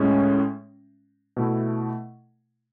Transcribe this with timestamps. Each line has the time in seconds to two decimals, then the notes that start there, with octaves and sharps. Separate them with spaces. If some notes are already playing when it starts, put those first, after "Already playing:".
Already playing: A2 G#3 C#4
1.37 B2 A3 E4